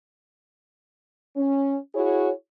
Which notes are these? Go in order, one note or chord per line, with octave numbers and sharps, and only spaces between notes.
C#4
E4 F#4 G#4 C#5